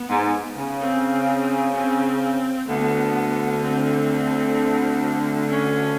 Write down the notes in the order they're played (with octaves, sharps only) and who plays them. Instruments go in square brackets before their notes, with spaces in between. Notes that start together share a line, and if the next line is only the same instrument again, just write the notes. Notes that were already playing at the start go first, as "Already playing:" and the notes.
Already playing: [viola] B3
[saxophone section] G#2
C#3
[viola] C4
C4
[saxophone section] D2 D3 [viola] B3
[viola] C4
C#4